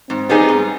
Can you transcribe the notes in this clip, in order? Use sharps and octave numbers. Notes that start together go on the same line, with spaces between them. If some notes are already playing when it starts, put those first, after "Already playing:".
G#2 C4
G3 B3 D#4 G#4
G#2